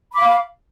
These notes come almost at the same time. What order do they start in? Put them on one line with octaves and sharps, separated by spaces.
B5 D6 F5